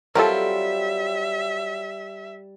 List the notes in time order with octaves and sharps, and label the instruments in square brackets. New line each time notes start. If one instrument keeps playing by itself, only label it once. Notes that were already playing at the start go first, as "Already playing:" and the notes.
[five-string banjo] F#3 C4 F4 [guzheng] G3 [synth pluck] A4 A#4 [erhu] E5